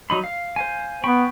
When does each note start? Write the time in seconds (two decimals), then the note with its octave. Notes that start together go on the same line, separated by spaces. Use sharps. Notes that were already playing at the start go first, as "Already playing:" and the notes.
0.10 F#3 D#4 B5
0.24 F5
0.56 C5 F5 G#5
1.04 B3 G5 B5 C#6